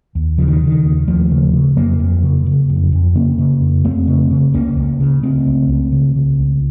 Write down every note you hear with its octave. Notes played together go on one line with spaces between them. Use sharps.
D#2
C#3 F3
D#3
C#3
D#3
D#2
D#2 F3 A3
C#3
C#3
F2 F#3 A#3
F2
C#3
C#3
F2
F2
C#3 A#3 C#4
C#3
F2
F2 A3 C4
C#3
C#3
C#2 A#3 C#4
C#2
C#3
C#3 A3 C4
C#2
C#2
C#3
C#3
C#2